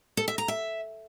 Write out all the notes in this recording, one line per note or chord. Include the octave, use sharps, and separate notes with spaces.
A4
E5
A#5
E5